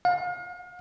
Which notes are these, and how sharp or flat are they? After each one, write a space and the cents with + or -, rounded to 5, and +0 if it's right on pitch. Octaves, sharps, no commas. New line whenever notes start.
F5 +40